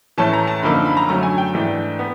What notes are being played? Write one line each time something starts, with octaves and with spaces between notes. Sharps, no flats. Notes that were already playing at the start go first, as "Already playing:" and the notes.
A2 E3 A3 C#4 A5
A#5
A5
F#2 D3 F3 A#3 D#4 B5
B5
A#5
F#2 D3 F#3 A3 C#4 A#5
G#5
G5
G#2 E3 A3 D4
B3